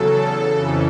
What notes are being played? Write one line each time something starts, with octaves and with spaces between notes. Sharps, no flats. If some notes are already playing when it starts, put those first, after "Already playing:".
Already playing: E2 C#3 F#3 A4
F2 C#3 E3